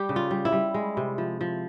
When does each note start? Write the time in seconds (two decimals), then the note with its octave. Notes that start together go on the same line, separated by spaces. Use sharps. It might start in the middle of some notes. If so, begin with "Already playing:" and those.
Already playing: G3 G4
0.09 C#3
0.16 F4
0.31 G3
0.45 E4
0.52 G3
0.74 G#3
0.97 C3
1.18 F3
1.41 F3